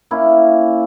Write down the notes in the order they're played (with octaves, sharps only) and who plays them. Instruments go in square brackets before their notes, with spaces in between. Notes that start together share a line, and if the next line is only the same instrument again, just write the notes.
[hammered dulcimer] A#3 C#4 E4